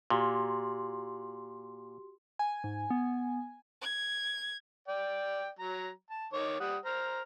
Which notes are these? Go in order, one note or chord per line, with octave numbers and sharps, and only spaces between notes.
A#2 F#4 G4 C6
G#5
G#2
B3
G#6
D5 G5
F#3 A#5
A5
D#3 C#5 D6
G3 F#5 D#6
C5 A#5 F6